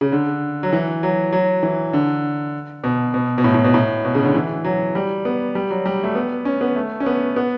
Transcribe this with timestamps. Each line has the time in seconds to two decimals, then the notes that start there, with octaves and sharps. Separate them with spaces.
0.01 C#3
0.12 D3
0.63 F#3
0.73 E3
1.03 F#3
1.32 F#3
1.63 E3
1.93 D3
2.84 B2
3.14 B2
3.38 B2
3.44 A2
3.54 A2
3.64 B2
3.74 A2
4.05 B2
4.15 C#3
4.25 D3
4.35 E3
4.65 F#3
4.95 G3
5.25 B3
5.55 G3
5.70 F#3
5.86 G3
6.04 A3
6.15 B3
6.45 C#4
6.61 B3
6.76 A3
7.00 C#4
7.06 B3
7.36 B3